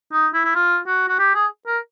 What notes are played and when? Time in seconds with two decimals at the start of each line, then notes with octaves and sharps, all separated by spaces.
0.12 D#4
0.33 E4
0.44 E4
0.55 F4
0.87 F#4
1.08 F#4
1.19 G4
1.35 G#4
1.67 A#4